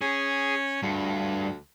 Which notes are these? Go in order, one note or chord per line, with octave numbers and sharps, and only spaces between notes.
C#4 G#4
D2 G2